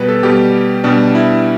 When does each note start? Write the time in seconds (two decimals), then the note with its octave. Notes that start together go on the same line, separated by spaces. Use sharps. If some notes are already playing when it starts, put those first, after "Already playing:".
Already playing: B2 G3 B4
0.08 A4
0.23 B2 G3 G4
0.84 B2 G3 D4
1.15 E4